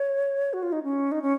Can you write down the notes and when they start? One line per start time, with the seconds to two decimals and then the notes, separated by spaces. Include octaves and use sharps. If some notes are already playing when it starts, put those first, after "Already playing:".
Already playing: C#5
0.53 F#4
0.63 F4
0.72 D#4
0.83 C#4
1.12 D#4
1.22 C#4